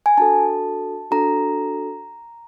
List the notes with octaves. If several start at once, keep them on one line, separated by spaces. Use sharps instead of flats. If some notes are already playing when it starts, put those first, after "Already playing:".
G#5
D4 F#4 A4 A5
D4 F#4 A4 A#5